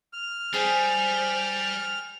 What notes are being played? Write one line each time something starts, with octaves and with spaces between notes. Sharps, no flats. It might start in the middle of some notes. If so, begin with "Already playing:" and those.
F6
G3 G#4 C5